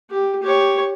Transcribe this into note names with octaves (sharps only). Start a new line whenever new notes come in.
G4
G4 C#5